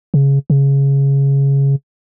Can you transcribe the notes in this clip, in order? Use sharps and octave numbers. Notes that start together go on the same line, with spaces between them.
C#3
C#3